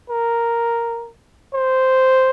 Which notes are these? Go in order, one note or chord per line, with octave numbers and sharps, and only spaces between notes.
A#4
C5